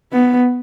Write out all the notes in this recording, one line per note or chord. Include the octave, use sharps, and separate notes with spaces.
B3